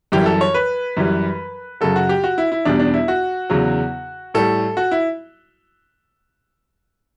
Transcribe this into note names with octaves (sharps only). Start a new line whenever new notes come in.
F#2 E3 G3 G4
A4
C#5
B4
F#2 E3 G3
F#2 C#3 F#3 A4
F#4
G4
F#4
E4
E4
E2 B2 G3 D4
D4
E4
F#4
E2 C#3 F#3
A2 G3 A4
F#4
E4